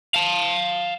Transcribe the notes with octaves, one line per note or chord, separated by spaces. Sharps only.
F5 A5